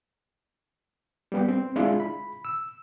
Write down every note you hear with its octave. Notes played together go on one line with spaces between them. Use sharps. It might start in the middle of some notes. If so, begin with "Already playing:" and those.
G3 B3 G4
C4
G#3 D4 E4 F4 G#4
B5
E6